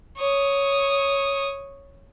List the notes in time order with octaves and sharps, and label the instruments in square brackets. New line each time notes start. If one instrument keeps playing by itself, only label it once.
[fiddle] C#5 D#6